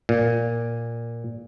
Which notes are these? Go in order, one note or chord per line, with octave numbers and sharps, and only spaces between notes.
A#2